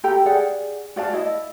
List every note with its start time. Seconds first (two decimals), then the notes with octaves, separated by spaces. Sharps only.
0.04 G4 A4 G5 A#5
0.26 G#4 D5 F5 F#5
0.96 F#4 D5 F5 A5
1.13 E4 D5 D#5